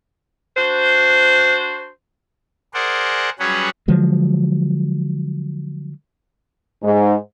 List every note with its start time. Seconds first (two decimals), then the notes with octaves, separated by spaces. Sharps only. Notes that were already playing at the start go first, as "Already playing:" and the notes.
0.56 D4 F#4 C5
2.74 G#4 A#4 C5 D5 F#5
3.39 F#3 G3 C#4 G#4 B4 F#5
3.88 D3 F3 F#3 G#3
6.83 G#2